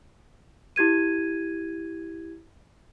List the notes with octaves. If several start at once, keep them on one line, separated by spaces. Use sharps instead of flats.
E4 G4 G#6 D#7